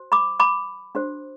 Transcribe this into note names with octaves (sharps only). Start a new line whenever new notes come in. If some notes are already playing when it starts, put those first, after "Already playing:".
Already playing: F#4 C5
B5 D6
B5 D6
D4 F#4 C5